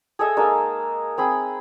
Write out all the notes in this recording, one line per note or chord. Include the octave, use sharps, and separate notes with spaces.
G#4 A4 D#5 E5
G#3 A#3 D#4 A5
C4 G#4 B5